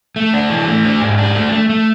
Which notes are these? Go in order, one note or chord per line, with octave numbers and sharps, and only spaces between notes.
A3
D4
E3
A3
D4
G#2
D4
A3
A3
A3